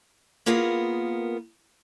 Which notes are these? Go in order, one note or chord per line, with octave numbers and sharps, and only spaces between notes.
A#3 B3 F4 G#4 A#4